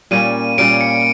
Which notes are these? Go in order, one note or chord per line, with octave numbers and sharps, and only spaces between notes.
A#2 G3 A#3 C#4 D#7
A#2 G3 A#3 C#4 D7
C#7